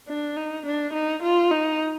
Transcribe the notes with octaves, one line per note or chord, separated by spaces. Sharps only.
D4
D#4
D4
D#4
F4
D#4